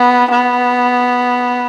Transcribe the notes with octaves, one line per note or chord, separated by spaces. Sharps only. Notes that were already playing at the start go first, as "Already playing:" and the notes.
Already playing: B3
B3